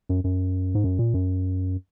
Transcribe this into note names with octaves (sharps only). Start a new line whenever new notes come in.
F#2
F#2
G#2
F#2
A#2
F#2